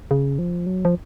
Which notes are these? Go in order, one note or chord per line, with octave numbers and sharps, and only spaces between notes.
C#3
F3
F#3
F3